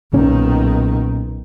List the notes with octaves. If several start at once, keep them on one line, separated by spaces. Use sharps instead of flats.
B1 A#2 D#3 C#4